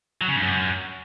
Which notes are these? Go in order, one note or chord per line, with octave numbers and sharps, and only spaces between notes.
F#3
C#3
G2
F#2